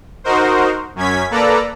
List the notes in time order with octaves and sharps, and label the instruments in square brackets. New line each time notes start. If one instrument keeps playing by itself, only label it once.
[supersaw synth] D#4 F#4 A#4 C5
F#2 C#4 G#6 B6
A#3 A4 B4 D5 A#5